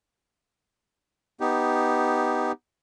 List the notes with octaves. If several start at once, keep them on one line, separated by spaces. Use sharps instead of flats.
B3 D#4 G4